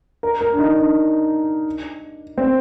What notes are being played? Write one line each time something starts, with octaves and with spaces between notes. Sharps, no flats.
A#4
A#4
D4
D#4
D4
C4